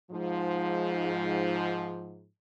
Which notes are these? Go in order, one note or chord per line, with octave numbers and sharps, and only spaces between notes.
G#2 F3